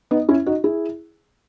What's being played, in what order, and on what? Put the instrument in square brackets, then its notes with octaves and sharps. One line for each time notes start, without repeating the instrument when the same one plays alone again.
[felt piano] B3 D#4
C#4 E4
D#4 F#4
E4 G#4